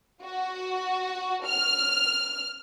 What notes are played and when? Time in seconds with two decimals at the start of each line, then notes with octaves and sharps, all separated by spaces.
0.23 F#4
1.45 F6